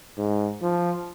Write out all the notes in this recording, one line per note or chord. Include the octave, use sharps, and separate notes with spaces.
G#2
F3